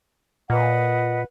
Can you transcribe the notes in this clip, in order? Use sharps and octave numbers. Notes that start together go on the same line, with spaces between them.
A#2 B4 D#5 F#5